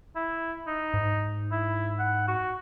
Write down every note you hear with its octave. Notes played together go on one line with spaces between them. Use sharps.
E4
D#4
G#2
E4
F#5
F#4